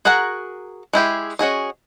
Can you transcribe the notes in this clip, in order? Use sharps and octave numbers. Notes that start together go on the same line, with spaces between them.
F#4 G#4 A#4 F#5 A#5
G#3 E4 G4 G#4
C#4 F#4 G#4 D#5